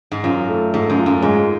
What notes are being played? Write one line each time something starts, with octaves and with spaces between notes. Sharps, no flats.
G#2
F#2 F4
A3
G#2 A3
F#2
F4
F#2
G#2 G#3